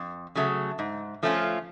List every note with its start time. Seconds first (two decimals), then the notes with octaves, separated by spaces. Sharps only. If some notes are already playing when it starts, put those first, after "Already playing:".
Already playing: F2
0.35 C#3 F#3 A3
0.79 G#2
1.23 F3 A3 C#4 F4